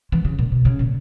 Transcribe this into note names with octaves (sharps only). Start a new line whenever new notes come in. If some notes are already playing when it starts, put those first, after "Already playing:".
E3
C#3
A#2
B2
C#3
A#2